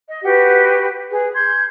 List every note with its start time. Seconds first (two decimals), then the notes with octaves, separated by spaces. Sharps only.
0.08 D#5
0.24 F#4 G4 B4 F#5
1.11 G#4 B4
1.34 C6 G6 G#6